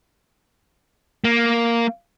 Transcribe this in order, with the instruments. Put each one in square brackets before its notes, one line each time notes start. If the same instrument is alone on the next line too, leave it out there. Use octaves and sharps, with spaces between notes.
[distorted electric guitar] A#3